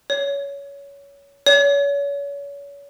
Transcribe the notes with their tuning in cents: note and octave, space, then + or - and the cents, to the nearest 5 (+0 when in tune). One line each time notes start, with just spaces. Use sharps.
C#5 +20
C#5 +35